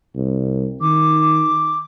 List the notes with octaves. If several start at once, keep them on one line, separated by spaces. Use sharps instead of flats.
C2
D#3 D6